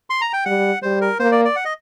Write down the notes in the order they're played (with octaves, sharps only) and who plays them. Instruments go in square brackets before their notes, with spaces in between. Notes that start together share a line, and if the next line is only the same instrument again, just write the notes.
[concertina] C6
A#5
G5
[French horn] G3 [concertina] F#5
[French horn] G3 [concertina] C5
[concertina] A#4
[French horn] A#3 [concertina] C5
[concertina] D5
D5
F#5
D#5